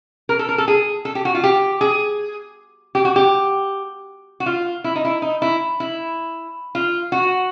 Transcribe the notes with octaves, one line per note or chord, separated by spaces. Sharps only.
A#4
A4
A#4
A4
G#4
A4
G4
F#4
F4
G4
G#4
G4
F#4
G4
F#4
F4
E4
D#4
E4
D#4
E4
E4
F4
F#4